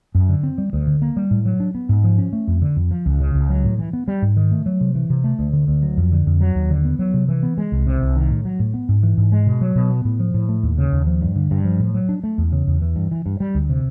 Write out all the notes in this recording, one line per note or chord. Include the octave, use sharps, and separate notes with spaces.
F#2
D3
C4
G3
D2
D3
A#3
G3
A2
F#3
D4
B3
G#2
F3
C#4
A3
F2
D3
F2
F3
C#2
C#3
C#2
F#3
A2
E3
B3
G3
G#2
D#3
A3
F#3
C3
E3
C3
A3
D2
D3
D2
F#3
F2
D3
F2
F#3
D#2
D3
B3
F#3
C3
E3
B3
G#3
C2
C3
C2
D#3
A2
F#3
A2
B3
G#2
E3
G#2
G#3
B2
F#3
B2
B3
A2
F3
A2
A3
D#2
C#3
D#2
F3
G2
D3
G2
F3
A2
F#3
D4
A3
E2
C#3
E2
E3
G2
E3
G2
G3
D2
C3